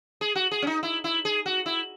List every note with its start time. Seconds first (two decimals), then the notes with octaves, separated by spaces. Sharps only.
0.21 G#4
0.35 F#4
0.51 G#4
0.62 C#4
0.67 D#4
0.83 E4
1.04 E4
1.25 G#4
1.46 F#4
1.66 E4